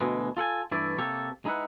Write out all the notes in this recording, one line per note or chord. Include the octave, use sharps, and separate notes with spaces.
D2 B2 E3 G#3
F4 A4 F#5 G#5
G2 E3 A3 E4 D5
C3 A#3 G4 A4 C#5
G#3 D#4 E4 B4 F#5